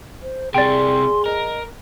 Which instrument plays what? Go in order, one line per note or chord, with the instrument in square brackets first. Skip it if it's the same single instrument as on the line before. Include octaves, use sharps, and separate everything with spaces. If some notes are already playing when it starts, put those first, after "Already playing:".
[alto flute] C5
[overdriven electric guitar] C3 G3 [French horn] G#4 [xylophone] D5 G5 [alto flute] C6
[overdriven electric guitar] A#4 [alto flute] D#5